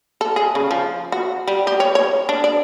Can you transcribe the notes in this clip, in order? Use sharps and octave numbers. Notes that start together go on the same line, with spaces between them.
A4
G#4
C#3
F3
F#4
G3
G4
C#5
C#5
D4
D5